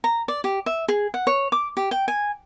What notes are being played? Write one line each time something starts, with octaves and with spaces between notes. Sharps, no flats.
A#5
D5
G4
E5
G#4
F#5
C#5
D6
G4
G5
G#5